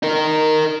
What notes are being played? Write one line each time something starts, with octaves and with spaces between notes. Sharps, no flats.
D#4 A#4